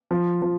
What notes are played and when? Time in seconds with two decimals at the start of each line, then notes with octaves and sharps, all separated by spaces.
0.11 F3
0.42 F3